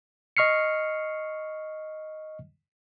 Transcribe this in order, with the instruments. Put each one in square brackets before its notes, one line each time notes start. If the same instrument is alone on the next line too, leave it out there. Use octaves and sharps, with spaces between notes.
[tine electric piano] D#5 C#6 F6 C7 C#7